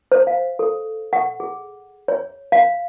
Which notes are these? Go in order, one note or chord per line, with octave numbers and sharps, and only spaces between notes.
C5
F5
A4
F#5
G#4
C#5
F5